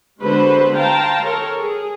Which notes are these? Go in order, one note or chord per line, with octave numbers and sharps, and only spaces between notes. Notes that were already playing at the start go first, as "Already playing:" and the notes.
D3 G#3 B3 F#4 B4 C5
F5 G5 A5 A#5 C6
A4 A#4 C#5
G#4